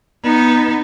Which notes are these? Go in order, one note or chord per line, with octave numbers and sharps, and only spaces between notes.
B3 D#4